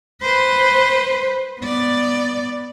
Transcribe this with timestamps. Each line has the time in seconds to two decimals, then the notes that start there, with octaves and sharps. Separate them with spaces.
0.23 B4 C5
1.61 B3 D5